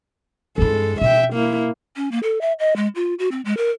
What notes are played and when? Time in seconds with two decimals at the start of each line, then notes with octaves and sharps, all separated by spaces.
0.58 G2 G#3 E4 A4
1.01 B2 E5 G5
1.34 A#3 E4
1.96 C#4
2.12 A#3
2.23 A4
2.41 E5
2.59 D#5
2.76 G#3
2.95 F4
3.19 F#4
3.31 C4
3.45 G#3
3.57 A#4